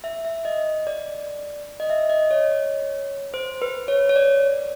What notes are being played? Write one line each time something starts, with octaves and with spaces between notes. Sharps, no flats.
E5
E5
D#5
D5
D#5
E5
D#5
C#5
C5
B4
C#5
C#5
D5